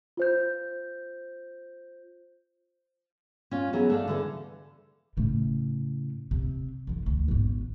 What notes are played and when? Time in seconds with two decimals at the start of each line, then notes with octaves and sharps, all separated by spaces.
0.17 F4 C5 G6
3.51 C#4 F4
3.73 E3 F#3 B3 G#4 A#4
3.90 A3 D4 F5
4.08 D3 E3 G#4
5.17 A2 C#3
6.31 C3
6.87 F2 E3
7.06 D2
7.28 G#1 B2